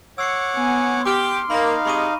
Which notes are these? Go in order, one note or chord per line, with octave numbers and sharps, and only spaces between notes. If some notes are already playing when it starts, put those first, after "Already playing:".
C#5 F#5 D6 E6 C7 C#7
B3 G#5
G4 C6 D6 F6 D7
A#3 D#4 F5 B5 A#6
C3 G#3 B5 C#6 D#7